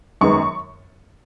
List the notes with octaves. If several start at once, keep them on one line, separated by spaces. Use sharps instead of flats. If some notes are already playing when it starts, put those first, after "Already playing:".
F#2 D#3 G#3 B3 C#6